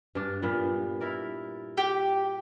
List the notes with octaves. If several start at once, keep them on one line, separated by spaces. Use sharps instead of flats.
G2 D4
G2 A#2 B3
E4 A#4 D5
G4